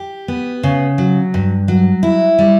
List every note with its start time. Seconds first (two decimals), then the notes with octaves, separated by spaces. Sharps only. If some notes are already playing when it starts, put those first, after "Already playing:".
Already playing: G4
0.28 B3
0.63 C#3
0.98 F#3
1.34 G2
1.68 F#3
2.03 E4
2.39 G3